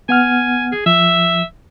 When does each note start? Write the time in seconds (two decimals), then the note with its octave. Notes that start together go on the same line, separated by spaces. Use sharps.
0.09 B3 F#5 G#5 F6
0.72 G#4
0.86 F3 E5